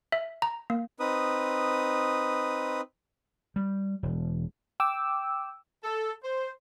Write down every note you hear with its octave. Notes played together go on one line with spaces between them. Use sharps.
E5
A#5
A#3
C4 D#4 B4 D#6
G3
E1
G5 D6 E6
A4
C5